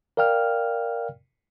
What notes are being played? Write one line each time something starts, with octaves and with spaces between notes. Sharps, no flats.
A#4 D5 F5 G5 F6